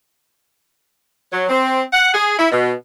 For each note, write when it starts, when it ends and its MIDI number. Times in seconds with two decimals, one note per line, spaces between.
1.32 1.45 54
1.49 1.81 60
1.93 2.14 78
2.14 2.34 68
2.38 2.47 64
2.52 2.72 47